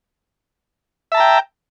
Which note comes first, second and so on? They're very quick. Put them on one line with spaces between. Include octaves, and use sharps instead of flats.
E5 A5 A#5 G5